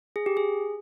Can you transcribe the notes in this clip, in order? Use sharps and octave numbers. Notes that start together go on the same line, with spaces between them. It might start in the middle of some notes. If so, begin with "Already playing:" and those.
G#4
G4
G#4